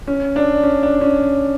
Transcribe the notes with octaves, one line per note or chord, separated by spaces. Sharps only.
C#4
D4
C#4
D4
C#4